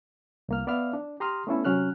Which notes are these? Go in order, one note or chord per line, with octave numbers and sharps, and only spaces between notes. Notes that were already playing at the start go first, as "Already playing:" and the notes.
C2 A#3 F6
B3 D5 E5 F5 F6
D4
G4 A#5 C6 D#6 F6
A3 B3 C#4 D4 E4 A4
C3 F#3 C#4 F6 F#6